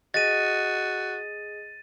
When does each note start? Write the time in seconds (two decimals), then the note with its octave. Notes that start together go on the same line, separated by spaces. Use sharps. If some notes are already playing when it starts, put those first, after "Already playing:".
0.14 F#4 G#4 D#5 A6 D#7